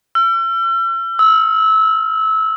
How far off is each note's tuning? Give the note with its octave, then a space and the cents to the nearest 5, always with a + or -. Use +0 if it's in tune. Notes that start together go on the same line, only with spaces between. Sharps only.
E6 +45
E6 -25